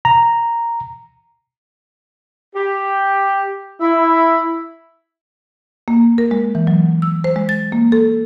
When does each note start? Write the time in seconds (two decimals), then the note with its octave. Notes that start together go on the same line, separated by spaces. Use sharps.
0.05 A#5
2.55 G4
3.81 E4
5.88 A#3
6.18 A#4
6.31 G#3
6.55 E3
6.67 F#3
7.02 E6
7.24 C5
7.36 G#3
7.49 A6
7.72 A#3
7.92 A4